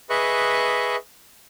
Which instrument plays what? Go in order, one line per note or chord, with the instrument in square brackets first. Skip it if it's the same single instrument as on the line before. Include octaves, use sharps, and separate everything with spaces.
[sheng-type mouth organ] G#4 B4 D#5 E5 C#6 F#6